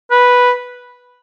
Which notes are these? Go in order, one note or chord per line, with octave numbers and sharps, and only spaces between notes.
B4